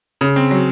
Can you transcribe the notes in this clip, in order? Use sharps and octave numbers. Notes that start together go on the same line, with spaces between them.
C#3
C4
F#3